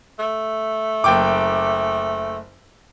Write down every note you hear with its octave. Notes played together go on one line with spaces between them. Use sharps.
A3
F#1 G5 D6